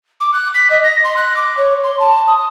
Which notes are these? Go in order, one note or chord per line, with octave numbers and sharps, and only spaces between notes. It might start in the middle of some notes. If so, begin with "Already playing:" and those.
D6
F#6
B6
D#5
A#6
C6
F#6
D6
C#5
C6
A5
D#6